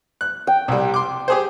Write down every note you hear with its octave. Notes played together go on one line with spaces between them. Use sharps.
F#6
G5
C2 G3
C6 D6
G4 G#4 C5